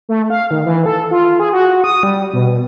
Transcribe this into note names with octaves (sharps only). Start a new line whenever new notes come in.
A3
F5
D#3
E3
A4
F4
G#4
F#4
D#6
G3
B2